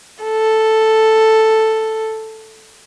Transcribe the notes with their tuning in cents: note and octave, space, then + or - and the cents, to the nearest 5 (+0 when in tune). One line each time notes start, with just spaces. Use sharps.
A4 +0